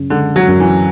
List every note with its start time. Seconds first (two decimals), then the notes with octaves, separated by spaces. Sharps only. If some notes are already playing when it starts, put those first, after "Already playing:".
Already playing: F#2 C#3 C#4
0.10 D3 G#3
0.36 F#3
0.48 F#2
0.60 E3